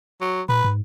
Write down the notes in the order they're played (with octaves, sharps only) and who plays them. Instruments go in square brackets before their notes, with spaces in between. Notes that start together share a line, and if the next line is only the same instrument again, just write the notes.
[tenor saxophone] F#3
[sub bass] A#2 [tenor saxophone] B4
[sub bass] G#2